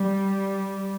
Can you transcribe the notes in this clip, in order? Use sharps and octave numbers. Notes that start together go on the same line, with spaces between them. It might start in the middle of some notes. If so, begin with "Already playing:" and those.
Already playing: G3